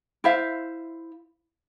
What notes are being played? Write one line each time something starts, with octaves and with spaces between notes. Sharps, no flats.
E4 C5 E5 F5